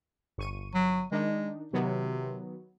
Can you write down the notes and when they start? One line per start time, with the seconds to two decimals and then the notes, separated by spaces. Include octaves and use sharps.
0.38 G1 C#6 D#7
0.75 F#3
1.12 D#3 G#3 D4 D#4
1.73 C3 D#3 F#3 B3